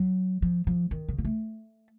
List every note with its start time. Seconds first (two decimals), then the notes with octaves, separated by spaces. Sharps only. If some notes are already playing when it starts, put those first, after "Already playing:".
Already playing: F#3
0.42 F3
0.67 F3
0.91 D#3
1.09 C#3
1.18 A#3
1.25 A3